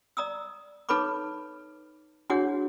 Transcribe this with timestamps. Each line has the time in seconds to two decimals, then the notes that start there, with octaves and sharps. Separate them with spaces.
0.17 D5 A#5 D#6 E6
0.89 D#4 A4 B4 C#5 B5 D6
2.30 D4 E4 F#4 G#4 C#5 F#5